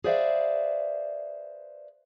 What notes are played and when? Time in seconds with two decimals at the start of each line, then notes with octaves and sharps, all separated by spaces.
0.04 G#4 B4 C5 D5 E5 F5